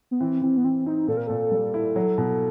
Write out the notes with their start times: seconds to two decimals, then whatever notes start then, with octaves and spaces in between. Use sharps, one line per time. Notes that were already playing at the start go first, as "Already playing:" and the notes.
0.11 B3
0.20 E3 C4
0.42 E3 C4
0.57 B3
0.64 E3 C4
0.86 C4 D#4
1.07 A#2 A4
1.17 A#4
1.27 A#2 A4
1.51 G3
1.74 E4
1.96 F#3
2.18 B2